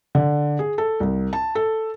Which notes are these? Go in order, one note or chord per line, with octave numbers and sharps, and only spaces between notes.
D3
G#4
A4
C2
A5
A4